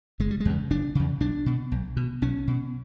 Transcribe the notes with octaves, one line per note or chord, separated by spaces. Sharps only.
F#1 G#3
G3
G#3
E2 C#3
F#1 D4
E2 C#3
B1 D4
B2
B1
B2
B1 C#4
B2